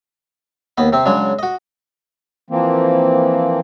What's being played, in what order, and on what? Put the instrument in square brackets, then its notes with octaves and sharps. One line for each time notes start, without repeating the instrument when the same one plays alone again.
[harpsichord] D#2 B3 D#5
C3 C4
C#3 F#3 G#3 D4
F#4 D#5
[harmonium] E3 F3 A#3 C4